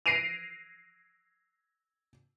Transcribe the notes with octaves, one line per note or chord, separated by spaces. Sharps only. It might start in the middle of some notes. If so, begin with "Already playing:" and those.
A#6 C7 D7 D#7 F7